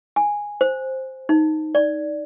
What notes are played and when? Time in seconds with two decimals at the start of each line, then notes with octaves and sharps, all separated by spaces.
0.16 G#5
0.61 C5
1.29 D#4
1.75 D5